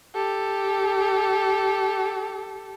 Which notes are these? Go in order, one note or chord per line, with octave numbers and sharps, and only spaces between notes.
G4 A4